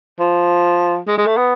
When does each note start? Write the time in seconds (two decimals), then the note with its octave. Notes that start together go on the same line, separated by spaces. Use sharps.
0.20 F3
1.07 G#3
1.18 G#3
1.27 A3
1.37 B3